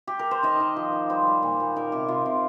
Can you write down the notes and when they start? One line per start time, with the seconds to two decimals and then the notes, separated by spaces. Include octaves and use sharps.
0.07 G4
0.19 A#4
0.31 C5
0.43 D#3 D#5
0.60 D#3
0.76 F3
0.93 D#4
1.09 G3 C5
1.27 G3
1.43 A#2
1.60 A#2
1.76 D#4 A#4
1.92 C3 G4
2.08 C3 F4
2.26 C3